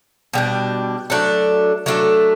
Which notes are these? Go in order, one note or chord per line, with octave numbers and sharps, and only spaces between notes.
B2 G3 D4
F#3 A3 D4 A4
F#3 A3 D4 A4